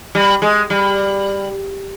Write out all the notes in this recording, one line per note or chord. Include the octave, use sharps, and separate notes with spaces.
G3
G#3
G3